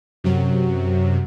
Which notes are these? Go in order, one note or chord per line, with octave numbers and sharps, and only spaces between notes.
F#2 C3 F#3